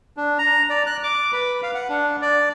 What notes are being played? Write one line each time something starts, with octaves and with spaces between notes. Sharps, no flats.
D4
A#5
D5
F#6
D6
B4
F5
F#5
D4
D5